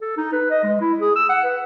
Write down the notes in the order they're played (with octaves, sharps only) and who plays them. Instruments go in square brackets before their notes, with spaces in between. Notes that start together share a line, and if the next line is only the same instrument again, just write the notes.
[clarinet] A4
D#4
B4
D#5
G#3
E4
G#4
E6
F#5
B4